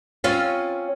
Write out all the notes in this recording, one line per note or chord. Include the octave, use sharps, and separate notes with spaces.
C4 C#4 F4